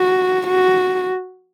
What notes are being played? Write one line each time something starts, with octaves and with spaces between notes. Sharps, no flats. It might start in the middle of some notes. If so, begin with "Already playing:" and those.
Already playing: F#4
F#4